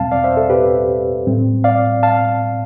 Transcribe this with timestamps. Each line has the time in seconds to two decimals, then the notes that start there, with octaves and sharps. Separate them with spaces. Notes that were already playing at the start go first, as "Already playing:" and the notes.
Already playing: E2 B2 G3 C4 F5 A5
0.11 D5 F5
0.24 C5 E5
0.37 A4
0.50 G4 B4
1.26 A2 G3 C4
1.64 D5 F5
2.03 F5 A5